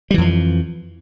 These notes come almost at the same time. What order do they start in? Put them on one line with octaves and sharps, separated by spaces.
G3 E3 F2 F3